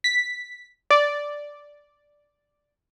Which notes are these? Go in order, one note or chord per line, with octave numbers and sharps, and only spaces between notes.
B6
D5